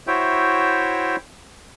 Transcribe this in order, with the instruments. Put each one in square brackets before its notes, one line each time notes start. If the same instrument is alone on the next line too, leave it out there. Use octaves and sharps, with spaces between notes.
[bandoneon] E4 F#4 C5 C#5 E5 G5